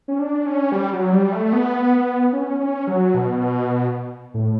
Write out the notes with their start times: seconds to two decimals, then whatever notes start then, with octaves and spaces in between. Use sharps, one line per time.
0.08 C#4
0.19 D4
0.46 C#4
0.72 G3
0.93 F#3
1.12 G3
1.32 A3
1.53 B3
2.33 C#4
2.60 C#4
2.87 F#3
3.14 B2
4.34 A2